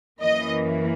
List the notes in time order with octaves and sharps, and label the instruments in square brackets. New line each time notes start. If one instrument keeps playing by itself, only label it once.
[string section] F#2 E3 A#3 D#5